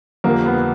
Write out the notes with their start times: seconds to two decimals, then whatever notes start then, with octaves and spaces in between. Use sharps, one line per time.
0.24 F2 D3 G3 A#3
0.46 B3